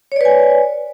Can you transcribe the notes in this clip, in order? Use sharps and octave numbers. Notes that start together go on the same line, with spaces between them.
B4 C#5 D5 G#5